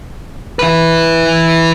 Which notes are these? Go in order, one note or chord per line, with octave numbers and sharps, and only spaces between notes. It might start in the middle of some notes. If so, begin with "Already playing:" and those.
E4 B4